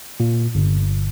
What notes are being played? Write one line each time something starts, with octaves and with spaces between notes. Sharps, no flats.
A#2
G1